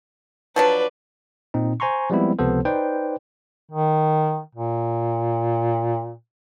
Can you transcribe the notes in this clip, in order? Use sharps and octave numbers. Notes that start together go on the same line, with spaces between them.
F3 F#3 D4 B4
A#2 C4 D#4
C5 G#5 A#5 C6 C#6
F3 G3 G#3 B3 C4 E4
C#2 C3 F3 B3 A4 C5
D#4 B4 C5 D5 G5
D#3
A#2